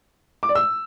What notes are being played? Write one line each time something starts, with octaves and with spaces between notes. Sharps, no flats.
D6
D5
E6